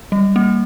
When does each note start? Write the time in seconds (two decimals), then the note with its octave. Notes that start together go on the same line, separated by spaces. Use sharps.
0.12 G3
0.36 A#3